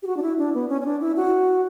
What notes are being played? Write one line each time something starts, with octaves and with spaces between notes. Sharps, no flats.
G4
F#4
D4
E4
D4
B3
C#4
C#4
D4
E4
F#4